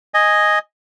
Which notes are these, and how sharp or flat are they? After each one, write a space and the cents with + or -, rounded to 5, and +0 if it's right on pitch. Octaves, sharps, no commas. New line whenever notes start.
D#5 +0 G#5 +0